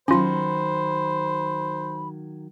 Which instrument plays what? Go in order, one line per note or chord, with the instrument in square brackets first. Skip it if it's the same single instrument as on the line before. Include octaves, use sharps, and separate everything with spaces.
[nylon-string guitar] D#3 F#3 [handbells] C#4 F4 [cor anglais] C5 [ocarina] B5